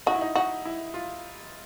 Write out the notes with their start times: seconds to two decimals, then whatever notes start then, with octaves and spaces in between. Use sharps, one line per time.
0.06 D#4 F#4
0.14 E4
0.21 D#4
0.35 D#4 F#4
0.65 E4
0.94 F4